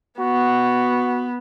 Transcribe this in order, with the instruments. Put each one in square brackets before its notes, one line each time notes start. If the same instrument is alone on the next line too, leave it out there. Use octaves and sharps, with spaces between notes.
[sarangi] B3 [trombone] F#4